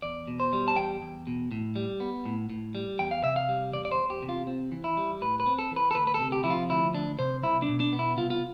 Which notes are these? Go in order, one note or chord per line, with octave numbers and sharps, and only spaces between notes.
E2 D5
B2
C5
G3
A5
E2 G5
E2
B2
A2
G3
B3
A2
A2
G3
E2 G5
F5
C3 E5
F5
G3
E2 D5
D5
C5
E2
G4
C3
F4
C4
E3
E4
G3
A2 B4
B4
C4
A4
E3
B4
A4
D2 B4
B4
A4
C3
G4
F3 E4
F4
D2 E4
D2 D4
C3 C5
C2 E4
D4
B2
D4
B3
E4
C2 F4
F4